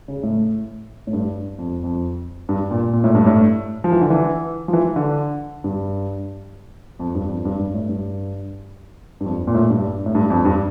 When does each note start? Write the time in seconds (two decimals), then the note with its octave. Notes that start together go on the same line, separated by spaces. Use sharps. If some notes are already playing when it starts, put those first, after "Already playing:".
0.08 C#3
0.23 A2
1.07 A2
1.13 G2
1.59 F2
1.84 F2
2.49 G2
2.71 A#2
2.93 A#2
3.04 A2
3.15 G2
3.26 A2
3.84 F3
3.92 E3
4.01 D3
4.10 E3
4.68 F3
4.73 E3
4.96 D3
5.64 G2
7.00 F2
7.15 G2
7.29 F2
7.45 G2
7.59 G2
7.74 A2
7.89 G2
9.20 G2
9.25 F2
9.47 A#2
9.54 A2
9.70 G2
10.06 A2
10.15 G2
10.30 F2
10.45 G2